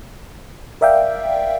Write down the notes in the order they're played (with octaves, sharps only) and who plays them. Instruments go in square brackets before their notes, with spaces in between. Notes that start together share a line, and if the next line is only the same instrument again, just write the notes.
[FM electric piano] A#4 D5 E5 F5 G5